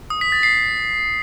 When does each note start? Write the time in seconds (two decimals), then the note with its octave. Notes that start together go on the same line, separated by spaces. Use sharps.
0.10 D#6
0.21 B6
0.32 A6
0.43 C7